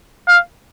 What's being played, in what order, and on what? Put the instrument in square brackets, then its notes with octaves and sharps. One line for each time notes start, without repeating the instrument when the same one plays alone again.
[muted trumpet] F5